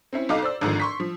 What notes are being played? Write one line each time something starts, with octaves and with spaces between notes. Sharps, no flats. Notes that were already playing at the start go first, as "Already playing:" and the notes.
C4 C#4 E4
B1 D#4 A4 F5 D6
C5 D5 E6
G#1 G#2 D3 F3
C6 C#6 B6
F3